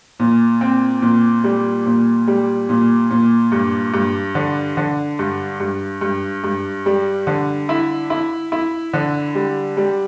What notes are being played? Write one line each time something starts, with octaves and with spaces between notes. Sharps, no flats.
A#2
C4
A#2
G3
A#2
G3
A#2
A#2
G2
G2
D3
D3
G2
G2
G2
G2
G3
D3
E4
E4
E4
D3
G3
G3